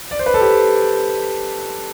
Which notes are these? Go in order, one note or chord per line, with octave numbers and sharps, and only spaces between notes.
D5
C5
B4
A4
G4